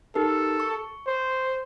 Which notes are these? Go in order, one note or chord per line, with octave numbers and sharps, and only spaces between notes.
D#4 G4 A4 A#4
C#6
C5